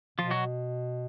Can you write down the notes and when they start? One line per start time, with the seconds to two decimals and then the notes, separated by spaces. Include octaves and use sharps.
0.18 B2 F3 F4
0.31 F#3 F#4